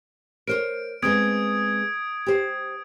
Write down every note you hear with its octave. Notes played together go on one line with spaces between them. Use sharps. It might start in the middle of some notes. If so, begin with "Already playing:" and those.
A#4 C5 C#5 D7
G#3 B3 C4 D#6 G#6 D7
G4 C5